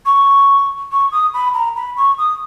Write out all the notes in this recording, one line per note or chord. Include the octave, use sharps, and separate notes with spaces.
C#6
C#6
D#6
B5
A#5
B5
C#6
D#6